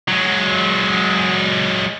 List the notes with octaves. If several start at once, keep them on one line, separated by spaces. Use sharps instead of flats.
F#3 G#3